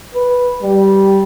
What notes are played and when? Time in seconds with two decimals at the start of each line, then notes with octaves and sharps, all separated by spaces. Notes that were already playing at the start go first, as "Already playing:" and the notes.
0.14 B4
0.62 G3